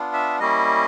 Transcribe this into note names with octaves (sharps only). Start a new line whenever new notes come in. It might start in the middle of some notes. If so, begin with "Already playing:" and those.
Already playing: B3 D4 F4
E5
G3 A#3 C#4 E4 D#5